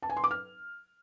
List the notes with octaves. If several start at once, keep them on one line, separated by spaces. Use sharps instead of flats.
A5
G#5
C6
D6
F6